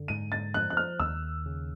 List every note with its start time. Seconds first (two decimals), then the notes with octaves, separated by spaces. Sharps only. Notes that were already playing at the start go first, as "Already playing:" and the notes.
Already playing: F#2 D3
0.08 G#2 D#7
0.32 A6
0.54 F3 F#6
0.70 F#6
0.77 F6
0.99 D#2 E6
1.46 C#3